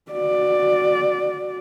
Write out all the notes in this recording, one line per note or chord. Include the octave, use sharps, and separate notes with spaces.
F#4 D5